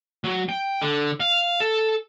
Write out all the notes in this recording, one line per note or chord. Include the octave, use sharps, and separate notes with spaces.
F#3
G5
D3
F5
A4